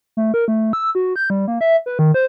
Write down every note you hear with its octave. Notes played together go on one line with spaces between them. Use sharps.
A3
A#4
A3
E6
F#4
G6
G3
A#3
E5
B4
D#3
C5